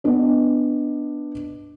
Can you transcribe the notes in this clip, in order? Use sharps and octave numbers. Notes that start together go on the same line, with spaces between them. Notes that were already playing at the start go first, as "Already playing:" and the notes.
B3 D4 D#5